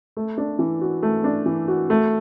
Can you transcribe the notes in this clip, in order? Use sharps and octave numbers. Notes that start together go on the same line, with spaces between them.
A3
D4
E3
F#4
A3
D4
E3
F#4
A3